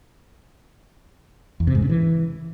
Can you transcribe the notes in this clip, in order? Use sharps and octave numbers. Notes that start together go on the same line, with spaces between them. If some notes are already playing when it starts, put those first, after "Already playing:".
E2
C3
G#2
C#3
E3